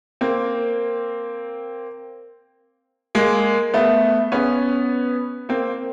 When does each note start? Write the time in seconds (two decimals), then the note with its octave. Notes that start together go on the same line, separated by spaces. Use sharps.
0.21 A#3 C4
3.15 G#3 A#3
3.74 A3 B3
4.32 B3 C#4
5.49 A#3 C4